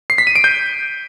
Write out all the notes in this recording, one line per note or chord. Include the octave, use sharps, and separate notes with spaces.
C7
B6
D#7
D7
G6